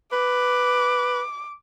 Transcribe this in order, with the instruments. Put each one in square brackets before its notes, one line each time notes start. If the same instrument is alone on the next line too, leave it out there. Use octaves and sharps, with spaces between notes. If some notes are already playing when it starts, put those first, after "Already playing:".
[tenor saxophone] B4 [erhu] D6